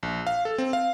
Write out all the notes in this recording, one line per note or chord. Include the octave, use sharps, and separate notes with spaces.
A#1
F5
A4
C4
F5